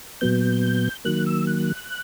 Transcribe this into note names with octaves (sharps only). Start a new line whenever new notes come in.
A#2 F#3 B3 G6
D#3 F#3 A#3 F#6
E6
F#6